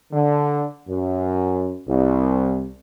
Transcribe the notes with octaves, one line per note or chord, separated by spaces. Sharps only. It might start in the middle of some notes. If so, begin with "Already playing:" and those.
D3
F#2
C2